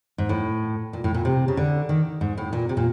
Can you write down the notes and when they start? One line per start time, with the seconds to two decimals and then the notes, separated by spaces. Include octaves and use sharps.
0.18 G#2
0.29 A2
0.93 A#2
1.04 A2
1.14 A#2
1.25 C3
1.48 C#3
1.57 D3
1.89 D#3
2.21 G#2
2.37 A2
2.53 A#2
2.69 C3
2.77 A#2